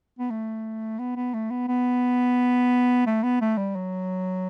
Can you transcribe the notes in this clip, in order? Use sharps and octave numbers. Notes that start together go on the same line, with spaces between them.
B3
A3
B3
B3
A3
B3
B3
A3
B3
A3
G3
F#3